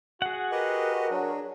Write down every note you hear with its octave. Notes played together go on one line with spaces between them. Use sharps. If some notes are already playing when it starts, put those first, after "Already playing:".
F#4 G#4 F#5
G4 A#4 B4 D#5
F#3 D4